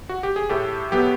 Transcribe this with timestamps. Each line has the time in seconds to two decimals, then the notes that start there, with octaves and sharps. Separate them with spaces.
0.09 F#4
0.23 G4
0.36 G#4
0.49 A2 G4 A4
0.92 F#3 B3 G4